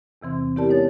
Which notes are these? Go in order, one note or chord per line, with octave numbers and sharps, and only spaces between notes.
E2 C3 E3 C4
B3 E4 G4 A#4 D5 A5
G#3 D#4 C#5 A6